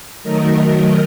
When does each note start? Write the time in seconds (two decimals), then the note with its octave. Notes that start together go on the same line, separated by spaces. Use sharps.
0.23 D#3 F#3 A3 A#4 D#5